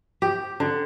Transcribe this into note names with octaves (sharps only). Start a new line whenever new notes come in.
G4
D3